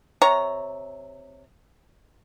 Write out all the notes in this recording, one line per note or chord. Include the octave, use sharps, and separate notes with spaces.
C3 C#5 A#5